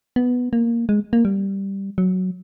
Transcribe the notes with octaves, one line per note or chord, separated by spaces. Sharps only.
B3
A#3
G#3
A#3
G3
F#3